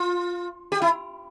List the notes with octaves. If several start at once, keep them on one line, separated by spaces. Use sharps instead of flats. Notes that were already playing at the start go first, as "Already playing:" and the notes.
Already playing: F4
G4
E4